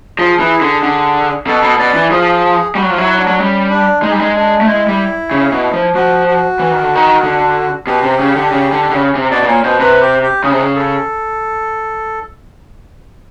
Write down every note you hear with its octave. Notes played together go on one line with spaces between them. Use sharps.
F3 G#4
E3
D3
D3
B2 A4
B2
B2 D5
E3
F3 G#4
G3 F#4
F#3
F3
F#3 E4
D4
F#3
G3 C#4
D4
G#3 D#4
G3
G#3
D4
A3
G#3 E4
G3
C#3
B2
F3
F3 F#4
F#4
E3
D#3
D3
D#3
D3
B2 G4
C3
C#3
D3
C#3
D3
D3
C#3
C3
B2 D5
B2
A#2 C#5
B2 C5
C3 B4
G4
G4
C#3 G#4
C3
C#3
A4